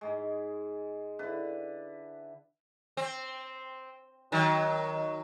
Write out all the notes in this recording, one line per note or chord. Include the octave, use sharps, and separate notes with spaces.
G#2 G#3
D3 E4 B4
C4
D#3 F#3